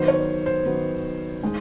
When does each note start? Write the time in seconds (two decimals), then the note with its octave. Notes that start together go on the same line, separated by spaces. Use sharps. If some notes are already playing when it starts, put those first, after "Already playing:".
Already playing: D#3 F#3 B3 C5
0.08 C#5
0.46 C5
0.65 D#3 F#3 B3
1.42 D#3 G#3